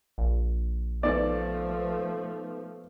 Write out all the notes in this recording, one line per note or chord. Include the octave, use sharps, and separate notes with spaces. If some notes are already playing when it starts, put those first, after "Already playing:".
A#1
F3 A3 B3 D#4 B4 D5